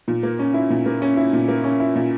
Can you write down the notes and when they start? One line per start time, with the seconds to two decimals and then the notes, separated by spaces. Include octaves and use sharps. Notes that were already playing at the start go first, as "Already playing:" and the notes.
0.08 A#2
0.23 A#3
0.39 C#4
0.54 E4
0.70 A#2
0.86 A#3
1.02 C#4
1.17 E4
1.33 A#2
1.48 A#3
1.64 C#4
1.80 E4
1.95 A#2